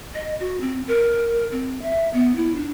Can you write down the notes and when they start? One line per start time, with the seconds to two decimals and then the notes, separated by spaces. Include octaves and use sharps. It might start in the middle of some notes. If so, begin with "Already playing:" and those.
0.14 D#5
0.40 F#4
0.61 C4
0.88 A#4
1.52 C4
1.82 E5
2.13 B3
2.36 E4
2.56 D4